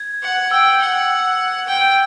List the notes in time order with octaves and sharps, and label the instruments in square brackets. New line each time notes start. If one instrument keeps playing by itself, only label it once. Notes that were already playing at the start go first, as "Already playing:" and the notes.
Already playing: [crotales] G#6
[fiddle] F#5
[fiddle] G5 [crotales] E6
[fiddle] F#5
G5